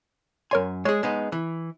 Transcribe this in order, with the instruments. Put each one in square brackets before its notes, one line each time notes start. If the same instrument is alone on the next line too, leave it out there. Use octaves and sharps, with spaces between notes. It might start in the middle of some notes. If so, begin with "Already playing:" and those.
[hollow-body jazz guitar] F#2 G#5 [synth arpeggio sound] A#4 C#5 C6
[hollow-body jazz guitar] G#3 G#4 [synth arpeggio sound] C#5
[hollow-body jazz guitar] G#3 B3 D#4
E3